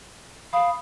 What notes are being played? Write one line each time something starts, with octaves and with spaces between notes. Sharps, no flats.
F5 B5 D#6